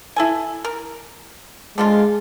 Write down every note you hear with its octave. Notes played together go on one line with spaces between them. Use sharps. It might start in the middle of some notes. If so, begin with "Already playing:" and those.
E4 A4 G#5
A#4
D3 F3 G#3 F4